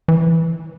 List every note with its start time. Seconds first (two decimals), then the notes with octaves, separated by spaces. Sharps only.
0.08 E3